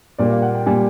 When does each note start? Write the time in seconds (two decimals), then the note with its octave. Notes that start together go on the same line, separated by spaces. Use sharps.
0.18 A#2 G3 A#3 D5
0.30 F5
0.42 F#5
0.55 G5
0.66 A#2 G3 A#3 G#5